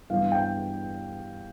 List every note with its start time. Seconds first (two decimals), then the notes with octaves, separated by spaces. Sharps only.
0.10 G2 E3 G3 B3 F5
0.32 G5